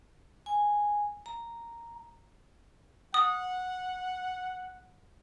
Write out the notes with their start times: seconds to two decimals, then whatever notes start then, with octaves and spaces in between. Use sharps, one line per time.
0.46 G#5
1.26 A#5
3.14 F#5 D#6